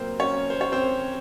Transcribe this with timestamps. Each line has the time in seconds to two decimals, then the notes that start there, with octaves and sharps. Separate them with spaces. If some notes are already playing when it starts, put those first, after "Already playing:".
Already playing: C3 F#3 A#3 C4 A#4 C5
0.20 C#4 C#5
0.50 C5
0.61 C#5
0.72 C4 C5